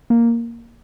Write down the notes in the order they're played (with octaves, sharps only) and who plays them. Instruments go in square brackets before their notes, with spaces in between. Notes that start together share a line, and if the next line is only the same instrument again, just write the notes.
[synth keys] A#3